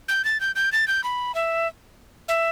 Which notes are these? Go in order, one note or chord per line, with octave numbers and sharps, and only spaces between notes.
G6
A6
G6
G6
A6
G6
B5
E5
E5